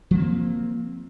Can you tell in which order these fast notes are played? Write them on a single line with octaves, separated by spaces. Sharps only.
F3 A#3 C4